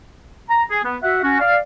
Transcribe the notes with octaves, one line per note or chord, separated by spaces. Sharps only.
A#5
G#4
B3
F#4 E5 F#5
C#4 F#4
D5 F5